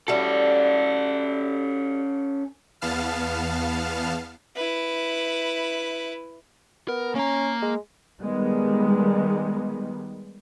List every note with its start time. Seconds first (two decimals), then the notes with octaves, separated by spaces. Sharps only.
0.08 G3 A3 C#4 F#4 A4
2.81 E2 B3 F5 A5 F6
4.56 E4 B4
6.88 B3 A#4
7.15 A#3 C#4 A#5
7.62 G#3
8.20 D#3 G3 G#3 B3